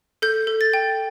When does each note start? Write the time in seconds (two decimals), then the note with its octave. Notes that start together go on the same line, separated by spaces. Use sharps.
0.22 A4 G6
0.47 A4
0.61 A6
0.73 G5